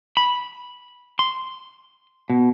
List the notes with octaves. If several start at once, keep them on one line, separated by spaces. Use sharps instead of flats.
B5
C6
B2